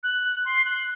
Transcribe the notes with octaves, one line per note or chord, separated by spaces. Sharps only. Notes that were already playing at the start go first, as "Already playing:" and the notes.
F#6
C6
F#6